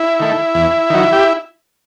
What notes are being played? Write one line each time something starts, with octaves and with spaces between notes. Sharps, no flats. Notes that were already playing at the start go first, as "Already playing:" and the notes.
Already playing: E4
D#3 A3
E2
D#3 F#3
G4